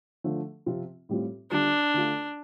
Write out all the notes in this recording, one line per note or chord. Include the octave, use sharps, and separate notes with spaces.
D3 F3 A3
C3 F3 C4 F4
A2 G3 C4 F4
D3 G3 D4 F4
D3 A3 F4